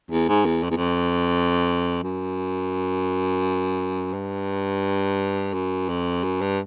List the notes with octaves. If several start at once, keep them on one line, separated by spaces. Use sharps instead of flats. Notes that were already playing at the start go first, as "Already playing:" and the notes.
E2
G#2
E2
F2
E2
F2
F#2
G2
F#2
F2
F#2
G2